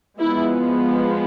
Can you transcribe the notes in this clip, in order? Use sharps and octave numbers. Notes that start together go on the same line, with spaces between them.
F3 G#3 B3 E4